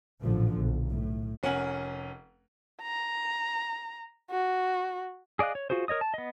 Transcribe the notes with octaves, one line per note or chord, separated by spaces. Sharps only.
A1 A#2 D3 F3
B1
A2
F1 C#4 A#4 F#5 G#5 F#7
A#5
F#4
G#4 D5 D#5 F5 F#6
C#5
F4 F#4 G#4 C5
A#4 C#5 D#5 D#6
A5
B3 D#5